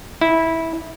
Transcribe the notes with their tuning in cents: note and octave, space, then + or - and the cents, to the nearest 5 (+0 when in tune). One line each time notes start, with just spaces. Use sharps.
E4 -15